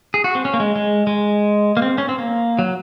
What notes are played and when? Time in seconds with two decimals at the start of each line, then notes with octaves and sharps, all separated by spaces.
0.14 G#4
0.24 F#4
0.35 C4
0.45 C#4
0.54 A#3
0.60 G#3
0.76 G#3
1.07 G#3
1.77 A#3
1.82 C4
1.98 C#4
2.09 C4
2.19 A#3
2.59 F#3